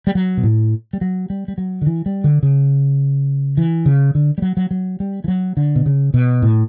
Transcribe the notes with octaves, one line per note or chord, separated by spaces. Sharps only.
G3
F#3
B2
A2
G3
F#3
G3
G3
F#3
D3
E3
G3
D3
C#3
E3
C#3
D3
G3
F#3
F#3
F#3
G3
E3
F#3
D3
B2
C#3
B2
A2